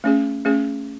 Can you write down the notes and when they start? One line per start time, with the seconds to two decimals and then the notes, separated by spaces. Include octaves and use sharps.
0.04 A3 C#4 G#4
0.45 A3 C#4 G#4